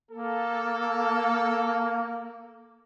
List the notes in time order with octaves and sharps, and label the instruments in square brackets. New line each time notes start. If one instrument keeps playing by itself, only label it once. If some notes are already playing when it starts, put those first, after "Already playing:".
[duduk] A#3 [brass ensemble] A4